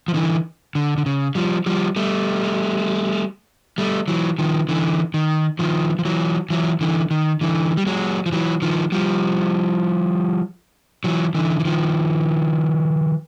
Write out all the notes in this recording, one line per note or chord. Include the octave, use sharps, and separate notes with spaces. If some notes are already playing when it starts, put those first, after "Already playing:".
F3
D3 E3
D3
D3
C#3
F3 G3
F3 G3
G3 A3
G3 A3
E3 F#3
D#3 F3
D3 E3
D#3
D#3 F3
F3
E3 F#3
E3 F#3
D3 E3
D#3
D3 E3
G3
F#3 G#3
F3
E3 F#3
D#3 F3
F3 G3
E3 F#3
D3 E3
E3
D#3 F3